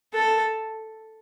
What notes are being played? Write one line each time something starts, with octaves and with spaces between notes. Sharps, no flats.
A4